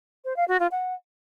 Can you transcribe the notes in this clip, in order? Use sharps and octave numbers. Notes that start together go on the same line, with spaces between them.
C5
F5
F#4
F4
F#5